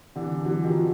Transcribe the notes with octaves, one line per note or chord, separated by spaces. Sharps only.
D3 E3
E3 F#3
D#3 F3